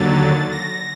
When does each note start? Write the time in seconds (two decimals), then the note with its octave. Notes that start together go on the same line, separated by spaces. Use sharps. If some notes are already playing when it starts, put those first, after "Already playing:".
Already playing: D#2 D3 F#3 A6
0.51 A#6